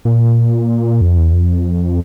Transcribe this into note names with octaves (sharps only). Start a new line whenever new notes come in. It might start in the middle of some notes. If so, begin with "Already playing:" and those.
A#2
F2
E2
F2